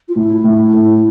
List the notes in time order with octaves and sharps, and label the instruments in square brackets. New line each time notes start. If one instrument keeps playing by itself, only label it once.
[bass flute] F4
[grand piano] A2 [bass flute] E4
[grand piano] A2
A2